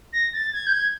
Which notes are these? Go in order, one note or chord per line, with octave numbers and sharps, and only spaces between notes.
A#6
A6
G#6
G6
G#6